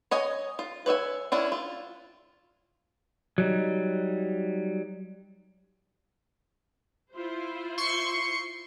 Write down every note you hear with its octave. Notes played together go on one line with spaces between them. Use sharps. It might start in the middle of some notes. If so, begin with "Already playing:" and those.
C#5 D#5 G#5
F4
B4 C#5 E5 G#5
C#4 D4 E4
F4
F#3 G3 D#4
E4 F4 C5
C6 C#6 C#7